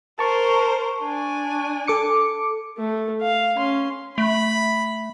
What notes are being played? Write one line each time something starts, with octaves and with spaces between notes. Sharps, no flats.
A#4 C5 A5 C#6
D4 G#5
A4 D6 C#7
A3
F5
C#4 C6
A3 B5